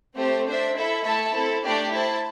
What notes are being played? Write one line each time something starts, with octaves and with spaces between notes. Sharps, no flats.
A3 C4 G4 C5
D4 C5 E5
E4 A4 E5
A3 E4 A4 E5 A5
C4 E4 A4
A3 D4 G4 D5
E4 C5 A5